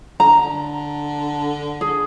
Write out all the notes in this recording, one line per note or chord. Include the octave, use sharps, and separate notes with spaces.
D3 A#5
G#4